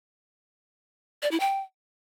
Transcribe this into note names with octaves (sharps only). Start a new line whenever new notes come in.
D5
E4
G5